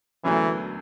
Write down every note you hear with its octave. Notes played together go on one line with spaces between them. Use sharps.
E1 D2 D3 E3 F#3 C#4